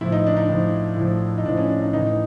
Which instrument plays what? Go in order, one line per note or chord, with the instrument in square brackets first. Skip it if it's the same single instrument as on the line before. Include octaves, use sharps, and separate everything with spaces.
[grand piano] A2 F3 E4
D#4
D4
D#4
A2 F3
A2 F3
D#4
A2 F3 D4
C#4
D4
D#4
A2 E3 D#4